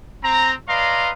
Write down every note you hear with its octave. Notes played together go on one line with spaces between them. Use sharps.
C4 A#5
B4 D5 D#5 F5 A#5 C6